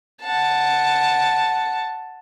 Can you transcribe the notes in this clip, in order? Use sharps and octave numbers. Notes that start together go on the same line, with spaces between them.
F#5 A5